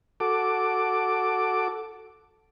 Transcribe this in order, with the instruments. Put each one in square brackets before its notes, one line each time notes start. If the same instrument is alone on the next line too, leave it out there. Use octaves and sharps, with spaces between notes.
[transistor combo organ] F#4 A4 D6